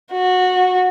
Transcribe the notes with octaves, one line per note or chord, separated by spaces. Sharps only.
F#4